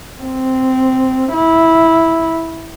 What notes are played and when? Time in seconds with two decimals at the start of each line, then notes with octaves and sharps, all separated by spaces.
0.23 C4
1.33 E4